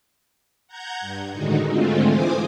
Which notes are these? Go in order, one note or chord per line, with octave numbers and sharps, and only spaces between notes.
F#5 A#5 G6 G#6
G2
A2 D3 D#3 G#3 D#4 F#4
G#2 D3 G#3 A3 C4 F4
E3 C5 G#5 D6 D#6